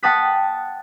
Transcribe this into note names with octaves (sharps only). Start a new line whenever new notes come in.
F#5 G5 A5 D#6 F#6 B6